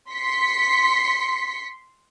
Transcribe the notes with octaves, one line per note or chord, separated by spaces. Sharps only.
C6 B6 C#7